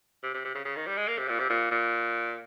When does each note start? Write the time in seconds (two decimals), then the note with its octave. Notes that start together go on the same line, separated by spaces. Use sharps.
0.23 C3
0.34 C3
0.45 C3
0.55 C#3
0.65 C#3
0.76 D#3
0.87 G3
0.97 G#3
1.08 A#3
1.18 C3
1.29 A#2
1.39 C3
1.50 A#2
1.71 A#2